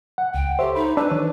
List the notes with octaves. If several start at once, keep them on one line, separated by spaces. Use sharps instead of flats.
F#5
C#2 G5
G4 A4 C5 C#5 E5
D#4 B5
D4 B4 E6
D#3 E3 C#5